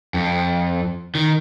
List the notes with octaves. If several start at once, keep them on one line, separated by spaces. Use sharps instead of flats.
F2
D#3